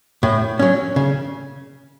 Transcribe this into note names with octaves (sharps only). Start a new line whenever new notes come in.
A2
F#3 C#4
C#3